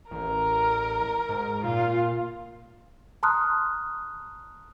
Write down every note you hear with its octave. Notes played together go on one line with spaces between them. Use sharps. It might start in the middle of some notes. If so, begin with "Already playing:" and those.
A1 A#4
G#2
A#2 F4
A5 A#5 C6 D#6 F6 F#6